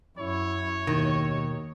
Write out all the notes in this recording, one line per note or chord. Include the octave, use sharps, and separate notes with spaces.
F#2 E4 C#5
D#2 B2 D#3